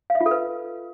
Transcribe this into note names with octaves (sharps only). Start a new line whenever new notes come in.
F5
E5
F4
A4
B4